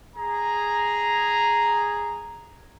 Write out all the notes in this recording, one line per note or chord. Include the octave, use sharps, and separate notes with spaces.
G#4 A#5